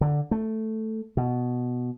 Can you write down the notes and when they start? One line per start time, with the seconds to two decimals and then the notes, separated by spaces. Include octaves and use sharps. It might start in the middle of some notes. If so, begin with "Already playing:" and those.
0.01 D3
0.31 A3
1.17 B2